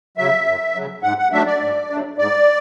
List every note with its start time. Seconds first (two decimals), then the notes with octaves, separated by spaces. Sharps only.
0.17 C#3 F#3 E5
0.46 F#2
0.75 C#3 F#3
1.03 G#2 F#5
1.18 F#5
1.32 F#3 A3 D4 E5
1.46 D5
1.61 G#2
1.90 F#3 A3 D4
2.18 G#2 D5